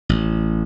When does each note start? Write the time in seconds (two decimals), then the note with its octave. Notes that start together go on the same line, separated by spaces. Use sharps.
0.09 A1